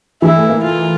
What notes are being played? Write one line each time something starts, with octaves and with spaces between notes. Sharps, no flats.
E3 E4
A3
A#3
F4